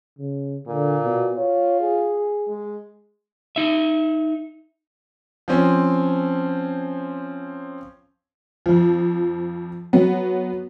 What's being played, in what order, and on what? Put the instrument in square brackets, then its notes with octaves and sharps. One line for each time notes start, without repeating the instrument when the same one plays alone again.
[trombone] C#3
[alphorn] A#2 [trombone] D3
[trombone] B2
[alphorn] F4 [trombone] C#5
[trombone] G#4
[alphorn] G#3
[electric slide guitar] D#4 E5
[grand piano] F3 C4 C#4
[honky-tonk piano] F2 F3
F#3 B3